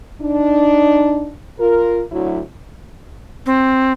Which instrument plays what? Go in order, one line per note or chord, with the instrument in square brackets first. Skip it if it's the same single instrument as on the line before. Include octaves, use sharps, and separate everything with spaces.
[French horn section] D4 D#4
F4 A#4
D2 F#3 E4
[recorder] C4